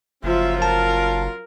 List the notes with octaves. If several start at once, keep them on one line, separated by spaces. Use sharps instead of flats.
F#1 F3 F#3 C#4 F4 E5
A#4 A5